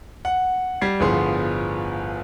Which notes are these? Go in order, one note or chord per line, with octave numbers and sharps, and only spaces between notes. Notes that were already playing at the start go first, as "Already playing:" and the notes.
F#5
G3 G#6 C7
G1 A2 F3 B3 G#4 C6